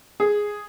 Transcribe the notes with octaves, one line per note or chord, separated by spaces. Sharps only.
G#4